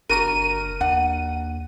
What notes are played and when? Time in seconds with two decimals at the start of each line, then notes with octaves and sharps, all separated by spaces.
0.09 F#1 D4 F#4 A#4 D#7
0.80 D#2 D4 F#5